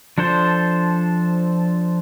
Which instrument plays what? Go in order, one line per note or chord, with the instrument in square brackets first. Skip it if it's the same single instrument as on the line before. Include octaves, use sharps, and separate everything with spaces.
[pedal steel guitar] F3 D4 A4 C5